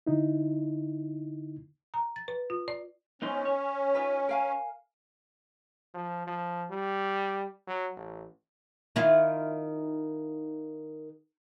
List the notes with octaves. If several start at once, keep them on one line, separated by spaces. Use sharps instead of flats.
D3 D#4 E4
A#5
A6
B4
F4
D5
B3 C#4 D#4 C5
C#5
D#4 F4 B4
A#4 F5 G#5
F3
F3
G3
F#3
A1
D#3 E4 F4